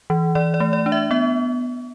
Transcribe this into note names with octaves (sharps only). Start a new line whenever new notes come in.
E3
E3 D5
D5
A3
D5
D4
E5
B3 E5